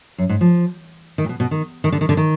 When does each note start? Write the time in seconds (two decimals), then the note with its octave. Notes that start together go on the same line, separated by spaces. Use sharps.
0.18 F#2
0.29 G#2
0.41 F3
1.18 D#3
1.25 A#2
1.29 B2
1.40 B2
1.51 D#3
1.84 D#3
1.92 D3
2.01 D#3
2.09 D3
2.17 D#3